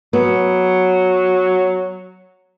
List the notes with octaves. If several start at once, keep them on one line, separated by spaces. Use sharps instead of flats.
F#3 B3